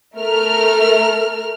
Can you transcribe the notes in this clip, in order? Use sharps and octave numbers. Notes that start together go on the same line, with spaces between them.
A3 A#4 F6